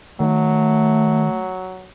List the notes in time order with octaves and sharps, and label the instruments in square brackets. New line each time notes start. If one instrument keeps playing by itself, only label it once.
[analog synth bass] D#3 [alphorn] F#3 [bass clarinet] A3